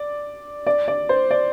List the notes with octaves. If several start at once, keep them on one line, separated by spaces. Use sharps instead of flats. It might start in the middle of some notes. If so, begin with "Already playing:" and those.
Already playing: D5
D5
D5
C5
D5